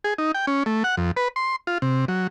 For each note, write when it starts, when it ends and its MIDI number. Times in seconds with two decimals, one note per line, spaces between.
0.04 0.14 68
0.18 0.32 63
0.35 0.46 79
0.47 0.63 61
0.66 0.83 57
0.84 0.95 78
0.97 1.11 41
1.17 1.28 71
1.36 1.56 84
1.67 1.78 65
1.82 2.05 48
2.08 2.27 54